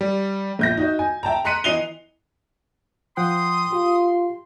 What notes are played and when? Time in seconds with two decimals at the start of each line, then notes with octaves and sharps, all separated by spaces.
0.01 G3
0.59 A#1 G6 A#6
0.77 D#4 F#4 D#5
0.99 G#5
1.23 E5 G5 A5 A#5
1.44 A#5 C6 F#6 B6 C#7 D#7
1.64 E3 D#5 C7 D#7 F7 G7
3.17 F3 F#5 G5 C6 D#6
3.72 F4 G4